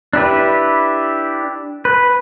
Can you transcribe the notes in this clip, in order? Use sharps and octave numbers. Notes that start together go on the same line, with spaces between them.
D4 E4 G4 B4
B4